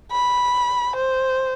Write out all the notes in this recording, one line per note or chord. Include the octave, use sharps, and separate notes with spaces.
B5
C5